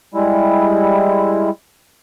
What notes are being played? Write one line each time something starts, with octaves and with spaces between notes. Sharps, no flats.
G3 G#3 E4